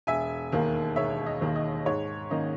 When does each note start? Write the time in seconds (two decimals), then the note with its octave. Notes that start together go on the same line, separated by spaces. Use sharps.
0.07 E1 E5 G#5
0.52 D#2 D#3 A#3
0.96 E1 C#5 E5
1.26 D#5
1.41 D#2 D#3 A#3
1.56 D#5
1.86 G#2 C#5
2.30 D#3 A#3 C#4 D#5